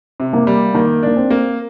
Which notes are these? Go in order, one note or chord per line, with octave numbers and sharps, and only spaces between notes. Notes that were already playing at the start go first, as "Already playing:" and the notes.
C3
A#3
G3
D#3 A#3
A#3 D4
C4
A#3